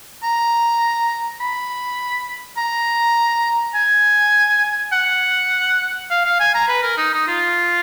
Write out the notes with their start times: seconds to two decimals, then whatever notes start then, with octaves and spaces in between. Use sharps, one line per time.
0.23 A#5
1.41 B5
2.57 A#5
3.75 G#5
4.93 F#5
6.10 F5
6.25 F5
6.40 G#5
6.55 A#5
6.68 B4
6.83 A#4
6.98 D#4
7.13 D#4
7.28 F4